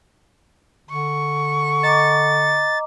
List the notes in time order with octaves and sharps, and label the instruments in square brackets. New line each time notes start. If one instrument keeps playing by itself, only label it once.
[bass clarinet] D3 [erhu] C#6
[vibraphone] D#5 A#5 D6 [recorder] A6